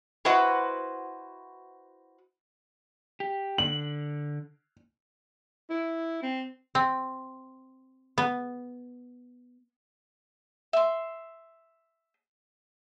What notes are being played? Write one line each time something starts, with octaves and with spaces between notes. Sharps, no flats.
E4 F#4 B4 C5 D#5 F#5
G4
D3 F#7
E4
C4
C4
B3
E5 C6